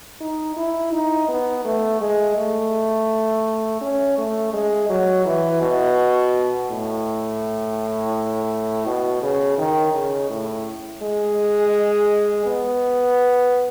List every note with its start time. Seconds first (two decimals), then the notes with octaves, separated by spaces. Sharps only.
0.21 D#4
0.56 E4
0.92 D#4
1.29 B3
1.64 A3
2.01 G#3
2.37 A3
3.81 C#4
4.18 A3
4.53 G#3
4.89 F#3
5.26 E3
5.62 B2
6.70 A2
8.86 B2
9.22 C#3
9.58 D#3
9.94 C#3
10.30 A2
11.02 G#3
12.46 B3